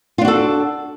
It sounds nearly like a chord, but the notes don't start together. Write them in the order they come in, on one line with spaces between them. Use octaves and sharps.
F4 D4 F#4 A4